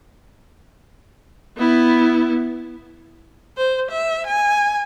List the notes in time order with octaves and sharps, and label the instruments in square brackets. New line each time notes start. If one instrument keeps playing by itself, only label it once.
[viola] B3 E4
C5
E5
G#5